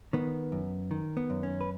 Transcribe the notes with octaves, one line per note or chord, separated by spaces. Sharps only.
D#3 B3
F#2
D#3
B3
F#2
C#4
B4